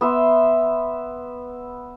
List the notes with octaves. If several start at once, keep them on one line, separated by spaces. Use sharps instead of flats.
B3 E5 C6